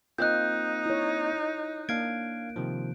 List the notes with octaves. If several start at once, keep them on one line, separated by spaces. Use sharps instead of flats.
A#3 C4 D#4 F4 D#5 F#6 G6
E4 C#5
A#3 D4 F5 G#6 D7
C3 D#3 F3